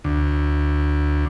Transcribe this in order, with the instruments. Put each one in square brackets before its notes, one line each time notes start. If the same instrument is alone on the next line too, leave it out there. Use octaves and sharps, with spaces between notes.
[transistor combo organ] D2